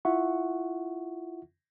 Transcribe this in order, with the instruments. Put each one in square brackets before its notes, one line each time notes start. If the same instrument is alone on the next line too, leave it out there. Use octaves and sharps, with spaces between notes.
[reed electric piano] E4 F4 E5 F#5 C#6